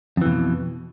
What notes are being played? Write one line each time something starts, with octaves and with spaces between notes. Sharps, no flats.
F2 B2 E3